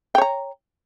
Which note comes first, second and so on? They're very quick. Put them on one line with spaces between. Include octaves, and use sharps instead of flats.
G5 C#5 A#5